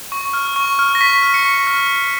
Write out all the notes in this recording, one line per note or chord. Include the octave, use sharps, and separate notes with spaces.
C#6
F6
C#6
F6
A#6
C#6 B6
F6
C#7
C#6
F6